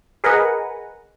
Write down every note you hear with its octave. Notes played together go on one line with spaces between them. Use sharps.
G#4 A#4 B4 D#5 F#5 A#5